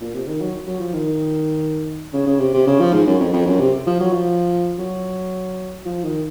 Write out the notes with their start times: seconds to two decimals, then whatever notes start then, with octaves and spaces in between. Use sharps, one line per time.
0.01 A#2
0.14 C3
0.27 D#3
0.41 F#3
0.67 F#3
0.80 F3
0.93 D#3
2.13 C#3
2.26 C#3
2.39 C3
2.54 C3
2.67 C#3
2.80 F3
2.93 G#2
3.07 F#2
3.20 F2
3.33 F2
3.46 F#2
3.60 C3
3.87 F3
4.00 F#3
4.13 F3
4.79 F#3
5.85 F3
6.03 D#3